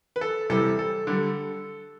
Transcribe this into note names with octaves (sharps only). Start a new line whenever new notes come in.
B4
A4
C3 E3 G3 A4
A4
D3 G3